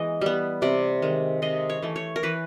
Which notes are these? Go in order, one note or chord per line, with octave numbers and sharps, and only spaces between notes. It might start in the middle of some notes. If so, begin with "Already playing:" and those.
Already playing: E3 G#3 B3 D#5
G3 B3
C3 D5
D#3 G#3
C3 D#5
C#5
E3 A3
C#5
A#4
E3 B4